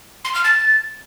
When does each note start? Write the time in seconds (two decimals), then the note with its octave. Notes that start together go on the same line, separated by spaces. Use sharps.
0.25 C6
0.34 F6
0.44 A6